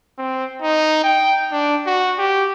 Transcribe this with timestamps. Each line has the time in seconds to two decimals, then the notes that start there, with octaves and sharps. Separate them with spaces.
0.18 C4
0.62 D#4
1.04 G5
1.52 D4
1.86 F#4
2.19 G4